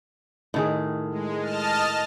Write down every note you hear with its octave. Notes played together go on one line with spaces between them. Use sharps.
A2 D#3 G#4
G#3
D#5 A5 F6